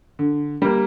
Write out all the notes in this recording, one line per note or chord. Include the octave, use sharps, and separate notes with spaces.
D3
G3 A#3